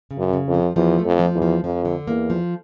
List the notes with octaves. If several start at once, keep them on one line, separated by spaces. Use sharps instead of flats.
C#3
F#2
C#3
F2
F3
E2 F3
A3
F2
F3
E2
F3
F2 F3
D3
E2 A#3
F3